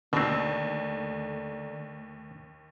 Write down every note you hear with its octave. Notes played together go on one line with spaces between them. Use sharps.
D#2 B2 D3 A3 C4 D5 A#5